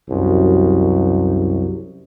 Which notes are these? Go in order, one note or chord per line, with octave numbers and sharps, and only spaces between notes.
C2 F#2